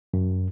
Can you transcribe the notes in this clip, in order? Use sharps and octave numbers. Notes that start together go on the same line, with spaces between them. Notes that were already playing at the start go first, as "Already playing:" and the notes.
F#2